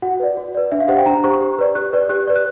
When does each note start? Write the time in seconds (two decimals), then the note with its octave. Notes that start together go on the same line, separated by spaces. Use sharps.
0.02 F#4 F#5
0.20 B4 D5
0.37 F#4
0.54 B4 D5
0.71 D4 E5
0.80 F5
0.88 G4 C5 F#5
0.97 G5
1.06 D4 A#5
1.24 G4 C5 C#6
1.41 G4
1.59 B4 D5
1.75 G4 F#6
1.93 B4 D5
2.09 G4 F#6
2.27 B4 D5
2.36 F#6